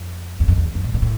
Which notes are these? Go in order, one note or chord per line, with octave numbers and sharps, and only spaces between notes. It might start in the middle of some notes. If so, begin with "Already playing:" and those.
Already playing: F2
E2
F2
E2
F#2
A#2
A#2
A2